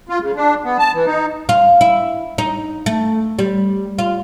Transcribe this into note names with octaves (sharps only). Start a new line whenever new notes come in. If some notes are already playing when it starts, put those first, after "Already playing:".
F4
C#3
D4
B3
A5
E3
D#4
F4
E4
D#4
A3
G3
F4